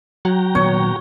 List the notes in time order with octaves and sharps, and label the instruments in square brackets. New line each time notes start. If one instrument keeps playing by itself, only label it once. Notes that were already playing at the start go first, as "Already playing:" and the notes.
[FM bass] F#3 [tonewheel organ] F#4 G5 A#5
[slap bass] A#2 D#3 B3 [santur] C#5